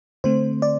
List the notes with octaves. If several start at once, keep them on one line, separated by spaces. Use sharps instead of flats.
D3 A3 C4 C5
D5